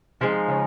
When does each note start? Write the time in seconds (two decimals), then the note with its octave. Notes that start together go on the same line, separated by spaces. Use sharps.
0.21 C3 F3 G#3 D#4
0.48 C#3